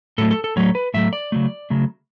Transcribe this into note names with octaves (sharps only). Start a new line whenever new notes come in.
A2 F#3 A3 A4
A4
A4
A2 F#3 A3 C#5
B4
A2 F#3 A3 E5
D5
C#3 F#3 A3
C#3 F#3 A3